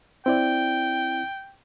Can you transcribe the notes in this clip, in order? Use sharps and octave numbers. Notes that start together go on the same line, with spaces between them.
C4 E4 D5 G5